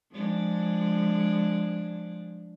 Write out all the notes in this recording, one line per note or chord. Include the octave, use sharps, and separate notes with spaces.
F3 G#3 D4